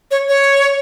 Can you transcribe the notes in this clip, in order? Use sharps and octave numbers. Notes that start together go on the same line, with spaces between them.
C#5
C#5